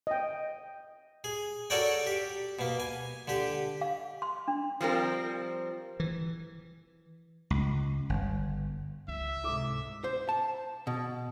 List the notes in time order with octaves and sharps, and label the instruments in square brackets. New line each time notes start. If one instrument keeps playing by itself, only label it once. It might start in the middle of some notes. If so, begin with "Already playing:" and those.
[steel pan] D#5 G5
[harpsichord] G#4
F#4 A4 A#4 C#5 D5 G5
G4
B2 A#3
G#5
D3 G4
[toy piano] F5
C6
D4
[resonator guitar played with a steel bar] F3 G3 C4 A#4
[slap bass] E3
C#2
G1
[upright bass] C#2 [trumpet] E5
[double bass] G#2 C3 [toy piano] E4 A4 D6
[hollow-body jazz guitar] C5
A5
B2